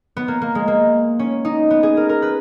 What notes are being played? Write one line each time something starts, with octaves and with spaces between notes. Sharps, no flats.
B3
A#3
A#3
G#3
A#3
C#4
D#4
B3
G#4
A#4
A#4
B4